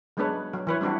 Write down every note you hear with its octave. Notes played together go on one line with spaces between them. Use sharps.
F#3 G#3 B3 D4 B4 C#5
F#3
E3 B4 C#5
G3 C4 D4 E4 F#4